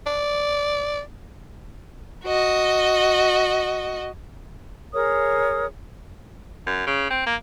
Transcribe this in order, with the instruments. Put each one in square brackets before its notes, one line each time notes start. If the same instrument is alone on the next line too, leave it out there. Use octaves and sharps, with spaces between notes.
[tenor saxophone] D5
[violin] F#4 D#5
[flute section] G#4 A#4 C#5 D#6
[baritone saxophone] F#2
C#3
C4
A#3